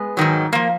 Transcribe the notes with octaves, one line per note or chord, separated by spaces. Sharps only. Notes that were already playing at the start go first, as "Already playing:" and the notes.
Already playing: G#3 B3
G#2 D#3 F#3
F3 A#3